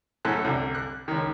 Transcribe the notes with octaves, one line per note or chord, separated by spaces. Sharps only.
F#2 A2 A4 F#6
C2 D3
F#6
C#2 D#3